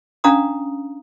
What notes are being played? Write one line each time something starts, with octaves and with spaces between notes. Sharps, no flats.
C#4 D4 F5 A#5 D#6